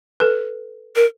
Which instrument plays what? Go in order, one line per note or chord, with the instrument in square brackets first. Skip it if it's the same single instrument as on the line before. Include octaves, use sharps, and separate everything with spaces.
[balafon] A4 B4
[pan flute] A#4